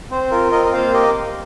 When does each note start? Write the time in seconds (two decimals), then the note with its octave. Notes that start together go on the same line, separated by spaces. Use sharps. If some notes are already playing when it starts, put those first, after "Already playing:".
0.11 C4 C5
0.31 F4 A#4
0.52 C4 A#4 D#5
0.66 D#5
0.72 A#3 C5 F5
0.93 G4 A#4 D#5